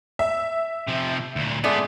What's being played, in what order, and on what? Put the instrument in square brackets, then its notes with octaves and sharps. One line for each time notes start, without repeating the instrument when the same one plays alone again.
[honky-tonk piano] E5
[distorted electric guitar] C3 F3
D2 A#2
[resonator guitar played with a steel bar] G#3 A3 D5 [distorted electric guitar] B3 F4